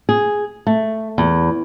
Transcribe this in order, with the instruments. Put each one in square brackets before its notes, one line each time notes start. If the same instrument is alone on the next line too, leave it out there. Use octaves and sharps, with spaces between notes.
[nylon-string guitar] G#4
A3
E2